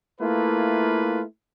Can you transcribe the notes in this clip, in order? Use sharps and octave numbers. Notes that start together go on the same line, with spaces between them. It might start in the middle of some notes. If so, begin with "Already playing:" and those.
A3 A#3 E4 F4 B4